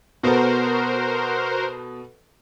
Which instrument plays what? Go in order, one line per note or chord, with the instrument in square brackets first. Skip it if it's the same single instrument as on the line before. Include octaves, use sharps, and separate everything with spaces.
[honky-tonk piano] B2 B3 A4 [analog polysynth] F#4 A#4 C5